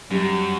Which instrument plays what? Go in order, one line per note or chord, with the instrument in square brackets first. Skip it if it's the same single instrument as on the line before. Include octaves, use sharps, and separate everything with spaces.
[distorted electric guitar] F#2 [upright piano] G3